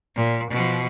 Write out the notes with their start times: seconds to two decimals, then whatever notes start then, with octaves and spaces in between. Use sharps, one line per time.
0.16 A#2
0.50 B2 F3